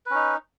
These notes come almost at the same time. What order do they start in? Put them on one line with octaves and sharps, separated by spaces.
B4 C#4 D#4